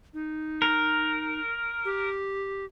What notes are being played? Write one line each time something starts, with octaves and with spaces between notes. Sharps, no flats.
D#4
A#4
G4